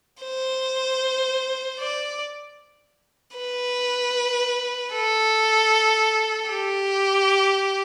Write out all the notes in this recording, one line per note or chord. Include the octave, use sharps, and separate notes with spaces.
C5
D5
B4
A4
G4